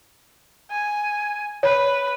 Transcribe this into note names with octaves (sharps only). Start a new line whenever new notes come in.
G#5
B4 C#5